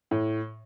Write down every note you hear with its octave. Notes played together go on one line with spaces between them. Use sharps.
A2